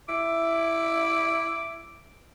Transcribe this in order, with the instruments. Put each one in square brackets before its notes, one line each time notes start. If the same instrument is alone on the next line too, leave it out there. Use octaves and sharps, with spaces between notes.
[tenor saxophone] E4 [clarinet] D6